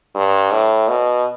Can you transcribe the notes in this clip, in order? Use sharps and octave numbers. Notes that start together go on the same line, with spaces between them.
G2
A2
B2